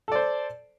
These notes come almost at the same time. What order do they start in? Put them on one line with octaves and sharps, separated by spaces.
A4 D5 C5